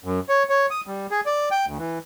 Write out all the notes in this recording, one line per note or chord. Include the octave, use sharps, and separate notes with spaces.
F#2
C#5
C#5
D#6
G3
G#4
D5
G5
D2
E3